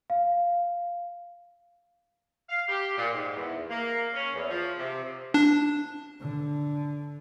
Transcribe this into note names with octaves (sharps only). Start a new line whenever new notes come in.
F5
F5
G4
A#2
G#2
E2
A#3
C#4
E2
F3
C3
D4
D3